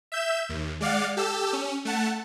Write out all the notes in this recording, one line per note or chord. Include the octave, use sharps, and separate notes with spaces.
E5 G6 E7
D#2
G#3 D5 F5 F#5
G4 A4 E6
C#4
A3 F#5 A5